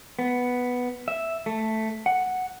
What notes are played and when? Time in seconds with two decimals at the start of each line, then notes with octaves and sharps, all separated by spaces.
0.19 B3
1.08 E5
1.46 A3
2.06 F#5